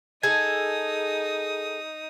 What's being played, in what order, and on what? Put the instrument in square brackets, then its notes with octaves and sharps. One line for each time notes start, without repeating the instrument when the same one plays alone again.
[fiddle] D#4 D#6 [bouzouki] G#4 A4 [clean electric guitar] G#5